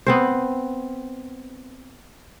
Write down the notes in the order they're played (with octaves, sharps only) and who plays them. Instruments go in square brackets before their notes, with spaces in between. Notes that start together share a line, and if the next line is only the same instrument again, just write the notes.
[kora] B3 C4 C5